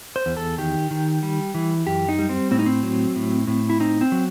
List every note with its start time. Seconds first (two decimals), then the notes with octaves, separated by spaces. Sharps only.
0.16 C5
0.26 E2
0.37 A4
0.58 D#3 G4
0.91 D#3
1.23 G3
1.55 E3
1.87 F#2 G4
2.09 D#4
2.19 G3
2.29 C4
2.51 A2 C4
2.59 D#4
2.66 C4
2.83 F#3
3.16 A2
3.47 A2
3.70 E4
3.80 C4 D#4
4.01 C4
4.12 F#3